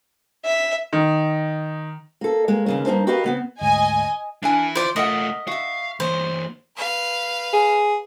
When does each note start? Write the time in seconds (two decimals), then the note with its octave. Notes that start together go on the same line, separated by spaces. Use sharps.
0.45 E5
0.93 D#3
2.21 A#3 A4
2.48 G#3 A#3
2.66 D#2 C#3 A#3
2.86 G2 D#3 A#3 D#4 C5 A5
3.07 F#4 G4 A#4 B4 D#5 F5
3.24 C#3 B3 C4
3.61 D2 G#2 D#5 G#5
4.43 E3 D4 E4 A#4 G#5
4.75 F4 C5 D5
4.96 A3 F4 A#4 D#5 E5 F#5
5.47 F#4 E5 F5
6.00 E3 A#3 C5
6.77 B4 F5
7.53 G#4